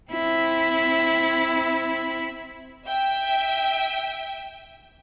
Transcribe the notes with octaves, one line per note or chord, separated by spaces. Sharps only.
C4 E4
E5 G5